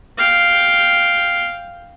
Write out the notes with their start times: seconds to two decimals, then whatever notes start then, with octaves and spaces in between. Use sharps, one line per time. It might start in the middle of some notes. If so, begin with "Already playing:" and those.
0.18 F5 G5